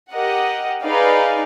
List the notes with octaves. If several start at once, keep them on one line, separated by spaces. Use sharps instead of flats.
G4 A#4 D#5 F#5
D#4 G#4 B4 D5 F5